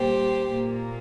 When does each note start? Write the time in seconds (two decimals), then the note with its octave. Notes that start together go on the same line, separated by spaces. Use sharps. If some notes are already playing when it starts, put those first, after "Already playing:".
Already playing: A#2 G3 A#3 G4 C5
0.51 A#2 A#3